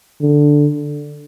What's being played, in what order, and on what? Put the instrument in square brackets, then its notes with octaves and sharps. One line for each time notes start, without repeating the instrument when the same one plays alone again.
[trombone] D3